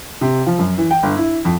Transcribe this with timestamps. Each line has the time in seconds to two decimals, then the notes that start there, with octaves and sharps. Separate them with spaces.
0.21 C3
0.47 F3
0.59 F#2
0.78 E3
0.91 G5
1.03 G1
1.16 E4
1.45 F2